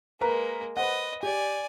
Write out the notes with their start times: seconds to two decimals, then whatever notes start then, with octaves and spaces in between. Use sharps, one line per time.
0.21 G#3 A#3 A#4 B4 A#5
0.77 B4 C5 D#5 F#5
1.23 G4 D5 G#5